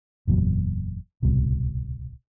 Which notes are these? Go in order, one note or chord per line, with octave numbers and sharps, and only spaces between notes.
F#1 E2 A#2 F#3
D1 C2 B2